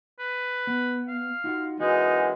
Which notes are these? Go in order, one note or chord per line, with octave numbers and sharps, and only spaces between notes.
B4
B3
F5
D#4 F4 F#4
F#2 E3 G#3 D#4 F#4